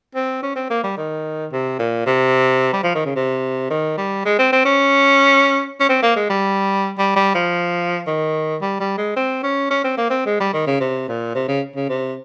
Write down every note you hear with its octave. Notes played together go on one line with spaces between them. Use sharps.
C4
C#4
C4
A#3
G3
D#3
C3
A#2
C3
G3
F3
D#3
C#3
C3
D#3
G3
G#3
C4
C4
C#4
C#4
C4
A#3
G#3
G3
G3
G3
F3
D#3
G3
G3
G#3
C4
C#4
C#4
C4
A#3
C4
G#3
G3
D#3
C#3
C3
A#2
C3
C#3
C#3
C3